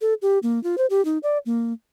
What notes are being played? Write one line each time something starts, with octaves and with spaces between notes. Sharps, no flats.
A4
G4
A#3
F4
C5
G4
D#4
D5
A#3